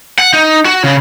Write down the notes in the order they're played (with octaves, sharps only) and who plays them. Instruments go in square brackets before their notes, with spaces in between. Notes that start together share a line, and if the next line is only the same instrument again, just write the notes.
[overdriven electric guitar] F#5
D#4
F#4
C#3